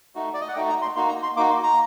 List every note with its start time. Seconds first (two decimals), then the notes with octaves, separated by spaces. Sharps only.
0.15 A3 D#4 F#4
0.34 D5
0.41 D#5
0.48 F#5
0.55 A3 D#4 F#4 G5
0.69 A#5
0.82 C6
0.96 A#3 D#4 F#4 C6
1.09 A#5
1.23 C6
1.36 A#3 D#4 F#4 D6
1.50 C6
1.63 A#5